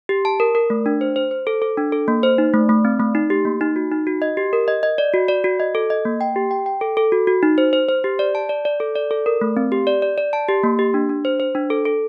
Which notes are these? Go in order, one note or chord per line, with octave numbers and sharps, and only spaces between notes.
G4
A5
A#4
A#4
A3
D4
C5
C5
C5
A4
A4
D4
A4
A#3
C5
D#4
A3
A3
C4
A3
D#4
G4
A#3
D#4
F#4
D#4
F#4
D#5
G4
A#4
D#5
D#5
D5
F#4
D5
F#4
D#5
A4
D#5
A#3
G5
G4
G5
G5
A4
A4
F#4
F#4
D#4
C5
C5
C5
G4
D5
A5
D5
D5
A4
D5
A4
A#4
A3
C4
G4
D5
D5
D5
A5
G4
A#3
G4
D4
D4
C5
C5
D4
A4
A4